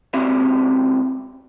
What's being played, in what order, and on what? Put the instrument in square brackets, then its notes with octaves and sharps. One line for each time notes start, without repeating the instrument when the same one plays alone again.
[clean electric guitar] C#2 C4 F#4 G4 E5 F5